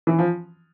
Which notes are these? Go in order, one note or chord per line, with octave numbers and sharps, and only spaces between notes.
E3
F3